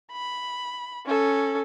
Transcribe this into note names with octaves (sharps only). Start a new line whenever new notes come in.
B5
C#4 A4